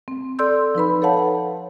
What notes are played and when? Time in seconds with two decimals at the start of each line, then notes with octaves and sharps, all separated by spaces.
0.08 C4
0.39 A4 D5 C6 E6 G6
0.75 F3 D#4 B4 B5
1.02 A4 B4 C#5 F5 F#5 A5